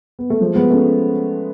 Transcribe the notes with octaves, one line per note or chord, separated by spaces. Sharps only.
B3
A3
F3 G#3
G#3 B3
A3 C#4